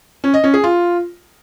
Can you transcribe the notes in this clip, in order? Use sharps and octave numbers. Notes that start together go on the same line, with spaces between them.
C#4
D#5
C#4
G#4
F4